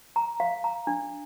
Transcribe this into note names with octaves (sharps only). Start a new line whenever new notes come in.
A#5
F5
A#5
D4